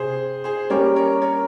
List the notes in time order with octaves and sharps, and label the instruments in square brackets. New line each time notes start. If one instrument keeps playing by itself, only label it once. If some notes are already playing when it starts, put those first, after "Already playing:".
Already playing: [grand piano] C3 [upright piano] G#4 C5
[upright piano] G#4 C5
[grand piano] G3 A#3 C#4 G4 [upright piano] A#4 C#5
[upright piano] A#4 C#5
A#4 C#5